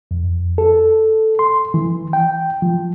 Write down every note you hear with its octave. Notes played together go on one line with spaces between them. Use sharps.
F2
A4
C6
E3
G5
F3